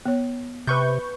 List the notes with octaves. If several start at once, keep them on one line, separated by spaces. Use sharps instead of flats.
B3 C#5
C3 B4 C#6 G6